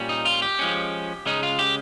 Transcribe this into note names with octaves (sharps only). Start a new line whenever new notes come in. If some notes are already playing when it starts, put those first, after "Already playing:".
Already playing: A#2 G3 C#4
D#4
F4
G4
F3 G#3 C#4
C#3 G#3 C#4 D#4
F4
G4